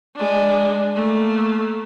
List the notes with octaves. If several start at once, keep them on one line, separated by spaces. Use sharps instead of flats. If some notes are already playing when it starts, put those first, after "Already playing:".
G#3 D4
A3 A#3